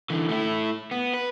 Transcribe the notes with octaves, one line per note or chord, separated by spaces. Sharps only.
D3 E3
A3 E4
B3
B4